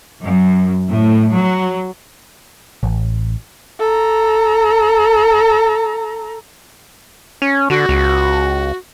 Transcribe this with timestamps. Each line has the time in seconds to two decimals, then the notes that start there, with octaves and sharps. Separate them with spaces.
0.23 F#2
0.90 A2
1.38 F#3
2.83 A1
3.79 A4 A#5
7.42 C#4
7.70 D3 F#4
7.89 C#2